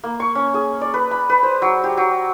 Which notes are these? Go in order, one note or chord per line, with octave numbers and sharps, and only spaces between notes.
A#3
C#6
C#4
G#4
D5
B4
B5
B4
C5
F#3
G4
F#3